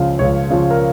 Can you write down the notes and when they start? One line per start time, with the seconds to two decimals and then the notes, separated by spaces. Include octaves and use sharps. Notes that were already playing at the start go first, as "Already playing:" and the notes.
Already playing: C#2 C#3 F3 F5
0.19 C#2 C#5
0.50 C#3 F3
0.71 A#4